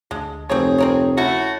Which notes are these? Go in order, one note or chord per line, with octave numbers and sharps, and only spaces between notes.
D2 G#3 A5
F1 C4 G#4 A#4 C#5
C4 A#4 C#5
A3 C#4 E4 F#4